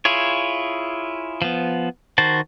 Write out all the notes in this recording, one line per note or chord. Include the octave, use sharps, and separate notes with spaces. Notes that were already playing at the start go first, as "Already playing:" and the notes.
E4 F4 G#4 C#5
F3 B3
D#3 F#4 C5 A5